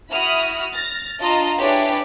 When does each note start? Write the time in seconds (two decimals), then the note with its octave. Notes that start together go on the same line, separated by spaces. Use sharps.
0.11 E4 F#4 B5 D#6 F6
0.73 F6 A6 A#6
1.19 D4 F4 D#5 A5 A#5
1.59 D4 E4 G4 G#4 B4 C#5